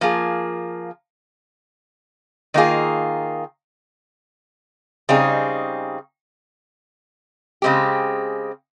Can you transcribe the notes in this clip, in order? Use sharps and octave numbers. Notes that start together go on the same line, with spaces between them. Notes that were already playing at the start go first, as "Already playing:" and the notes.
F3 A#3 F4 G#4
D#3 A#3 F4 G#4
C#3 G3 C4 D#4 G#4
C#3 G#3 C4 G4